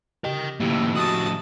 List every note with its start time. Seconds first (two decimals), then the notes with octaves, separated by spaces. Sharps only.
0.24 C#3 G4 A#4 D#5 G5
0.60 F2 A2 D#3 A#3 E4 G4
0.96 F#4 A5 D#6